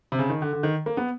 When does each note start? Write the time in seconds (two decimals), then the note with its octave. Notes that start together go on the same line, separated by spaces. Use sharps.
0.12 C3
0.19 C#3
0.30 D#3
0.42 D3
0.53 D3
0.63 D#3
0.86 A#3
0.97 B3